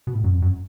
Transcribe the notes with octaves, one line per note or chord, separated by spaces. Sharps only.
B2
A2
F#2
F2
F#2